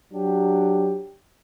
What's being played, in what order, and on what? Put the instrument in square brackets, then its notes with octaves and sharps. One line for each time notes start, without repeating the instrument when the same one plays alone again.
[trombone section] F#3 D4 G4